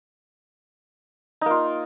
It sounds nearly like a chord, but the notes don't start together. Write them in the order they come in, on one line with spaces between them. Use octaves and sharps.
D#4 A#3 F4